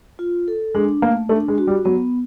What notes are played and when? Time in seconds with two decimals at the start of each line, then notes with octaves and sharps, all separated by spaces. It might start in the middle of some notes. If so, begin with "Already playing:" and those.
0.19 F4
0.48 A4
0.75 G#3 D4
1.02 A3 A#3
1.29 A3 D4
1.48 G#3
1.58 F#4
1.67 G3
1.85 F#3 B3